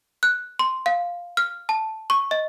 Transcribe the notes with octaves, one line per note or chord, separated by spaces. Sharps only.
F#6
C6
F5
F6
A5
C#6
D#5